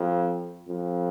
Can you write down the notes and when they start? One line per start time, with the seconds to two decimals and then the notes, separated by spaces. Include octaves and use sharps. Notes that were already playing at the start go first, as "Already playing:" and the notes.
Already playing: F2
0.69 F2